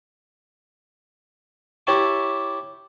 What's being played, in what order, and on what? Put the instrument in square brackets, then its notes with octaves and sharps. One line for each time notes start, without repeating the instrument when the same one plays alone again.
[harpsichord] E4 G4 C#5 E5 A5 C#6